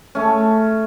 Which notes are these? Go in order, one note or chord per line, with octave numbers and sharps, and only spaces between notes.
A3 C#4